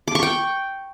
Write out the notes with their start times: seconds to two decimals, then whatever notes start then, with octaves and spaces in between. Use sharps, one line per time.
0.08 D6
0.15 C#6
0.23 G5